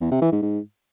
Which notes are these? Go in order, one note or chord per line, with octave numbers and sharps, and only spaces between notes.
E2
C3
E3
G#2
G#2